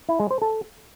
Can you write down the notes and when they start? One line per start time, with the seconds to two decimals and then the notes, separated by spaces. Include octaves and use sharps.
0.09 E4
0.20 G#3
0.31 C5
0.42 A4